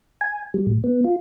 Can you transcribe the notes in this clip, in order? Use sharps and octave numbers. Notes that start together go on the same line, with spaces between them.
G#5
G3
A2
B3
F4